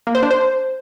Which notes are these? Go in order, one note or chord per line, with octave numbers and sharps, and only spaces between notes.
A#3
C5
D4
C5